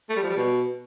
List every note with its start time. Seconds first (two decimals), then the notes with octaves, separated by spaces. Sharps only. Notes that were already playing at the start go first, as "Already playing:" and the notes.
0.10 A3
0.16 G3
0.23 F3
0.30 G3
0.37 B2